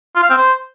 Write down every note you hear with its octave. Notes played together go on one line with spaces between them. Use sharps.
F4
F5
C4
C5